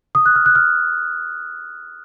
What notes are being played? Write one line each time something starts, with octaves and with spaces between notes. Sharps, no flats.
D#6
F#6
F6
F#6
F6